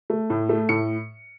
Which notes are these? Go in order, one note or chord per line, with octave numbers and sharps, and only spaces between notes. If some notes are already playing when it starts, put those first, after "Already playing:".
A3
A2
A3
A2 C#7